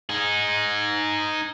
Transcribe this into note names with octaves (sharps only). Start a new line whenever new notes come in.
D#4 G#4